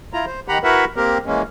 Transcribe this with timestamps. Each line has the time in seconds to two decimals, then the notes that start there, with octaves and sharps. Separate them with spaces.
0.13 E4 F4 A#5
0.26 C5
0.48 D#3 G4 F#5 A#5 B5
0.64 E4 F#4 A#4 B4 E5 F#5
0.96 A#3 C4 G4 A#4
1.26 E3 G#3 A#3 C#4